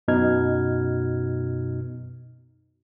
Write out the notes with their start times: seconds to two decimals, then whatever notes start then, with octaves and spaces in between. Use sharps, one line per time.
0.08 F#2 B2 D#4 F6 G#6